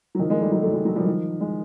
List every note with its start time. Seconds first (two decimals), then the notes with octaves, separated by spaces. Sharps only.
0.15 F#3
0.19 D#3 F3
0.30 G#3 A#3
0.41 G3 A3
0.51 F#3 G#3
0.62 G3 A3
0.73 F#3 G#3
0.85 F#3 G#3
0.96 F3 G3
1.06 D#3 F3
1.41 G#3